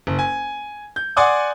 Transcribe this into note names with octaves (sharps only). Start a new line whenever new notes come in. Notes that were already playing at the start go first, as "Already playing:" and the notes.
F#1
G#5
G6
D5 F#5 G#5 C6 D6 D#6